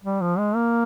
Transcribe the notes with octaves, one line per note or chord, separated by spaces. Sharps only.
G3
F3
G#3
A#3